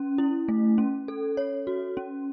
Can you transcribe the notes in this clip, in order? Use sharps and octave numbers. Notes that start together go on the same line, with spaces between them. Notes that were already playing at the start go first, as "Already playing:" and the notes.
Already playing: C#4
E4
A3
C#4
A4
C#5
F#4
C#4